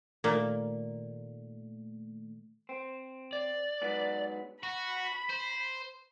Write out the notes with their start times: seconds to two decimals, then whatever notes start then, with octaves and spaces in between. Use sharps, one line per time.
0.24 A#2 D#3 A3 A#3
2.69 C4
3.33 D5
3.82 G#2 F#3 B3
4.63 F#4 B5
5.30 C5